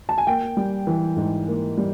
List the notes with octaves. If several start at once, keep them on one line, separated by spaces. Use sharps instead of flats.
A5
G#5
A#3 G5
G3
E3
G#2
A#3
G3